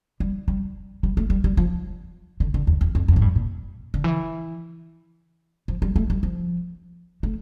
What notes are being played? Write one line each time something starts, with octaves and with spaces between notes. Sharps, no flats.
G3
G3
G3
A3
G3
G3
F3
D3
D3
E2
E2
F2
F2
A2
G2
A#2
D3
E3
F3
G3
A3
G3
F3
A3